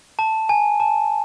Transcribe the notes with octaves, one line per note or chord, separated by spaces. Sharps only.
A5
G#5
A5